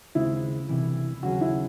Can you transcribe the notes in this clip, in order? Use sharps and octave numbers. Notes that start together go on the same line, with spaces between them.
D#2 C#3 G#3 C4 E4
C2 C3 E3
D#2 C#3 F#3 C#4 F#4 G#4
E4